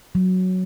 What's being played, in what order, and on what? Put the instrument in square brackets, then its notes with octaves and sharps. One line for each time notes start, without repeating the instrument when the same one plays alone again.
[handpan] F#3